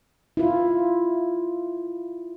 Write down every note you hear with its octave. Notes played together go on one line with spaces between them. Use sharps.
E4 F4